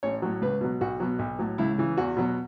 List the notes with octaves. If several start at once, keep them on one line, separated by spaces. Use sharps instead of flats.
A1 C#5
A2 F#3
C#2 B4
B2 F#3
B1 F#4
B2 F#3
B1
A2 F#3
C#2 E4
C#3 E3
E2 F#4
B2 F#3